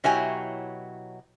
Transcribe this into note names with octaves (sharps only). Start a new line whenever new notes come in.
B2 F#3 E4 G4 C#5 G#5